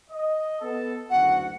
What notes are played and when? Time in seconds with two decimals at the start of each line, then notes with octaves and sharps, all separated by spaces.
0.10 D#5
0.61 B3 A4
1.10 F#1 D2 F#4 F#5